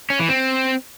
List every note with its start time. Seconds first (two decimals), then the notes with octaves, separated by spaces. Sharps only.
0.10 C#4
0.19 E3
0.29 C4